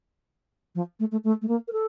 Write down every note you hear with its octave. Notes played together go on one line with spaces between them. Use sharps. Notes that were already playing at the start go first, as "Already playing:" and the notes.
F3
A3
A3
A3
A3
A#3
A#4
A4